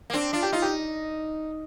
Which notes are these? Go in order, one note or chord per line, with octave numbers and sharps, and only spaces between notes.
A#3
C4 D4
D4 F4
G4
D#4 F4
G4